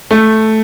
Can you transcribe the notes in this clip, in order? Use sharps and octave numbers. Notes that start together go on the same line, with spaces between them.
A3